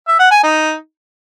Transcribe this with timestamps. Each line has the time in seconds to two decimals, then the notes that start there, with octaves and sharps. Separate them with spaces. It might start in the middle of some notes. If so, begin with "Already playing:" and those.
0.07 E5
0.19 F#5
0.31 G#5
0.43 D#4